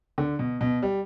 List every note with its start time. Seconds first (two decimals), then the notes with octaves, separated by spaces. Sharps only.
0.18 D3
0.39 B2
0.61 B2
0.82 G3